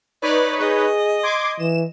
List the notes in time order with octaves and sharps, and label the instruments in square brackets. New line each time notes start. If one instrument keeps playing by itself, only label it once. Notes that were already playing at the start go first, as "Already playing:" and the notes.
[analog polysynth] D#4 B4 C#5 [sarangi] D5
[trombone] G#4 [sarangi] D#5
[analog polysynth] C6 D6 G#6
[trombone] E3 [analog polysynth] E7